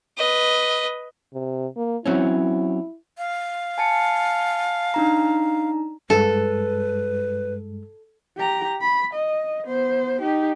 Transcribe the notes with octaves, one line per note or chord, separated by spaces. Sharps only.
B4 D#5
C3
A#3
F#3 C4 C#4 E4
F5
G#5 A5 C#7
D4 D#4 A#5
G2 G#3 A4 B4
G4 A#5
B5
D#5
B3 C5
D#4 G4